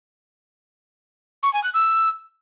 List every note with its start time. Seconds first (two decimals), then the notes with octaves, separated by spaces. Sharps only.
1.43 C#6
1.53 G#5
1.64 F#6
1.74 E6